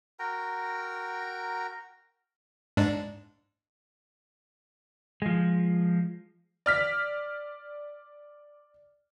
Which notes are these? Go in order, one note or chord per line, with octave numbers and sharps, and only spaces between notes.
F#4 A#4 G5 A#5
G#2 D4
F3 G#3
D5 F6 B6